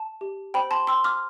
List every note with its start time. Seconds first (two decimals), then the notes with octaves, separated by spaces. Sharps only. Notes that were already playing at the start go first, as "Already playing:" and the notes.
Already playing: A5
0.21 G4
0.54 C5 G5 B5
0.71 A5 C6
0.87 G5 C6 E6
1.04 D6 F6